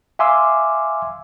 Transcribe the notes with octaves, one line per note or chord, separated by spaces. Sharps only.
E5 F5 G#5 C6 D6 E6